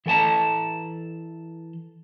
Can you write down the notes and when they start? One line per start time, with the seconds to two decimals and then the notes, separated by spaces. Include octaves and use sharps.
0.06 E3 A4 G5 A5 A#5